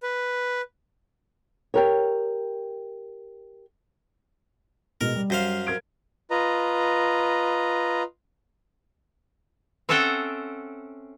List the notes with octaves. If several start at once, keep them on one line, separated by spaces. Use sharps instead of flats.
B4
G4 A#4 C#5
B2 G#3 A#4
G3
F#2 C5 F5
A#4 G#6 D7
F4 B4 D#5 A#5
C4 C#4 A4 E5 F#5 G5